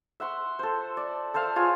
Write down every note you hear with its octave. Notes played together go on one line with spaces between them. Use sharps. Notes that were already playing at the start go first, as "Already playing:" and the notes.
E5 F#5 C6 C#6
A4 C5
D5
A4 C5 E5 F5
F4 G#4 C#5 G#5